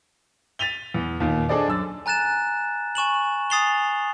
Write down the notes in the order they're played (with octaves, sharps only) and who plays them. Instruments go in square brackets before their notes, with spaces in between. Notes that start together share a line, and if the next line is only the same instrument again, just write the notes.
[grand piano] A6 B6 D#7 F7 G7
E2
D#2 A#2 D#3
D4 G#4 A4 C5 D5 D#5
F#2 E6 A6
[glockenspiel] G#5 A#5 F#6 A6 E7
G#5 C#6 E7 F#7
G#5 D#6 A6 C7 F7 G7